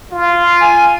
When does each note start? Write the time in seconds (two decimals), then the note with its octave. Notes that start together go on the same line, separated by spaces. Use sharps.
0.12 F4
0.61 G#5